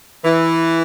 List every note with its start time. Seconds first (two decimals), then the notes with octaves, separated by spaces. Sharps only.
0.25 E3